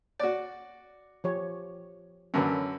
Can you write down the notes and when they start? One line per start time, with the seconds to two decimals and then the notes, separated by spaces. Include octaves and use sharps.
0.19 F#4 D5
1.24 F3 G4 C#5
2.34 F#2 D3 C#4 A#4 B4